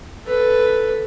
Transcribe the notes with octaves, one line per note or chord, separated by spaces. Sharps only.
A4 B4